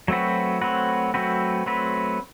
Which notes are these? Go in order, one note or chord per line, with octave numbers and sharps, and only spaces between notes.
F#3 A3 C4 F#4 B4
F#3 A3 C4 F#4 B4
F#3 A3 C4 F#4 B4
F#3 A3 C4 F#4 B4